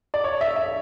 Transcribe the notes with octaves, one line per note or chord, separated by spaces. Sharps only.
D5
C#5
E5
E5